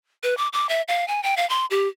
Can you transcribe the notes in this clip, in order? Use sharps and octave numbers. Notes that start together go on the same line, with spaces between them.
B4
D6
D6
E5
F5
G#5
G5
F5
C6
G4